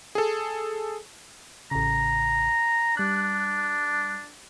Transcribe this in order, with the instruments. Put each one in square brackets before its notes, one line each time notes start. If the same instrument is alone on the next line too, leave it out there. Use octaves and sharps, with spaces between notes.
[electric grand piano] G#4 A4
[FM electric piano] A1 C#3 [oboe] A#5
[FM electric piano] G3 F#6 [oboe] D4